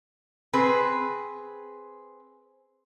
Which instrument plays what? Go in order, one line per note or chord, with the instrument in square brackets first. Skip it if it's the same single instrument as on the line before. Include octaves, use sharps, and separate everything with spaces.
[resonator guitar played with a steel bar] C4 G#4 B4